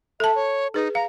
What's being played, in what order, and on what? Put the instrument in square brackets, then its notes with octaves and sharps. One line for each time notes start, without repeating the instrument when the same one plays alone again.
[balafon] A4 A5 [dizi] E5
[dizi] C#5
[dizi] D#4 [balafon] G#4 B4
[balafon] F5 [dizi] A#5